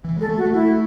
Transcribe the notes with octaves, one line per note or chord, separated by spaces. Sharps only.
E3
G#3 A4
A3
F#4
A3
A3 E4